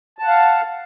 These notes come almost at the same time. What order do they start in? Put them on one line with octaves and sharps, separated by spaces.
A5 F#5 F5